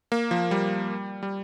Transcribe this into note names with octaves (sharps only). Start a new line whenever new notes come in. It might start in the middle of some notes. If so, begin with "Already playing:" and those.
A#3
F3
G3
G3